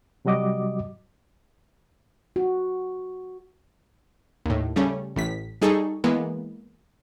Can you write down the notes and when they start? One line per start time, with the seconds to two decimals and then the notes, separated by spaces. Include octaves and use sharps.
0.25 C3 F#3 G3 F#4 D#5 D6
2.36 F#4
4.46 D#2 A2
4.76 C#3 G3 A3 C#4
5.16 A1 A2 B6
5.62 G3 D#4 G#4 A4 C#6
6.04 E3 G#3 A#3 B3